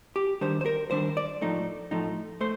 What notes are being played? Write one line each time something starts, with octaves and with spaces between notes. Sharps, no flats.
G4
D#3 G3 D4 C5
C5
A#4
D#3 G3 D4 C5
D5
A2 F3 A3 D#4
A2 F3 A3 D#4
A3 C5